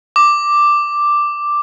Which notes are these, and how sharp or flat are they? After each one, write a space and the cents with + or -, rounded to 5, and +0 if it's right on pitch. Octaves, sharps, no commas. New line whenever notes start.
D6 +5